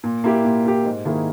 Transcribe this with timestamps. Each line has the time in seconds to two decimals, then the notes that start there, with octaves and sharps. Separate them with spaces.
0.04 A#2
0.24 A#3 E4 G4
0.45 A#2
0.65 A#3 E4 G4
0.85 G#2
1.05 D#3 A#3 E4 G#4